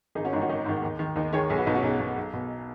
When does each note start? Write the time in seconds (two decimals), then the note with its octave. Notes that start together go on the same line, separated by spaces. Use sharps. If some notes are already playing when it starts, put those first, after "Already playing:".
0.15 G#1 D#4 G#4
0.24 C#4 F#4
0.32 G#2 D#3 D#4 G#4
0.41 C#4 F#4
0.49 G#1 D#4
0.66 G#2 D#3
0.82 D#2
0.99 D#3
1.16 D#2 D#4
1.33 D#3 G#4 C#5
1.50 B1 G#4 C#5
1.58 F#4 B4
1.67 B2 D#4 G#4
1.74 C#4 F#4
1.83 B1 D#4 G#4
2.00 B2
2.17 B1
2.33 B2